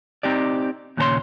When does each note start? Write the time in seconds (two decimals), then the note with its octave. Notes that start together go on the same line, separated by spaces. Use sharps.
0.23 C4 D#4 G4 D5
0.97 D#2 A#2 C#3 A4 C#5 C6